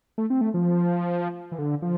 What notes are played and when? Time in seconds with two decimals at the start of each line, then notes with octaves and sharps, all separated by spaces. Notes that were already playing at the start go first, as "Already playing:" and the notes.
0.18 A3
0.30 C4
0.41 A3
0.54 F3
1.52 E3
1.59 D3
1.82 F3